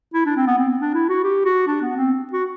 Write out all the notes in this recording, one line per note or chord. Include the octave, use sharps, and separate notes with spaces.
E4
D4
C4
B3
C4
D4
E4
F#4
G4
F#4
D4
B3
C4
F#4